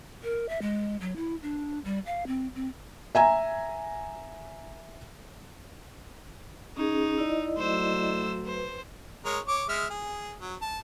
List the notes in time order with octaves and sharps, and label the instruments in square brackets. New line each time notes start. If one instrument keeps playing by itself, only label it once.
[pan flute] A#4
E5
G#3
F#3
E4
D4
G3
F5
C4
C4
[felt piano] E5 G#5 A#5
[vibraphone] C#4 G#4 [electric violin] D#4
[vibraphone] E4 D5 D#5
[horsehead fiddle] F#3 A3 [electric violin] C5 E6
[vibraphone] B4 [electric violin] C5
[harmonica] G#3 A#4 C#5
C#5 D6
G#3 E5 F6
G#4
F#3
A5